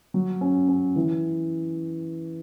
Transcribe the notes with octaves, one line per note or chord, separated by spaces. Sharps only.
F#3
C#4
C#4
E3